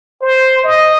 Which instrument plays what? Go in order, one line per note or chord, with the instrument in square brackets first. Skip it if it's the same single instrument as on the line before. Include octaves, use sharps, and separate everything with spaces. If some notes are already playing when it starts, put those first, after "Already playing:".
[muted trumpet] C5
D#5